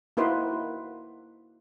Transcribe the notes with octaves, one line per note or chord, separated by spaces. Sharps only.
A#3 D#4 E4 F#4 B4 C5